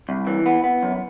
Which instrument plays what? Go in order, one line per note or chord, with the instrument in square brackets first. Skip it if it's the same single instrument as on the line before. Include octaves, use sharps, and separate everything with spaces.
[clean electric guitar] C2
E3
B3
B3
F#2